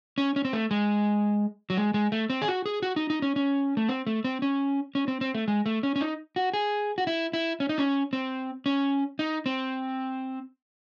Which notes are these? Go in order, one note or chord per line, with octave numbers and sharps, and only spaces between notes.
C#4
C#4
C4
A3
G#3
F#3
G#3
G#3
A3
C4
G#4
F#4
G#4
F#4
D#4
D#4
C#4
C#4
A3
C4
A3
C4
C#4
C#4
C4
C4
A3
G#3
A3
C#4
C#4
D#4
F#4
G#4
F#4
E4
E4
C#4
D#4
C#4
C4
C#4
D#4
C4